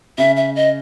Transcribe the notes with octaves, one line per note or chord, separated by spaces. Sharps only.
C#3 E5
E5
D#5